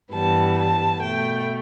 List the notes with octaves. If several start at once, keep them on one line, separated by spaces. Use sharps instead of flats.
G2 E3 G3 B3 A5
A5
B2 A3 G5